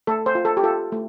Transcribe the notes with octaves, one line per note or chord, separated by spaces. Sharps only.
A3 A4
C5
F4
A4
G4
F4 A4
A3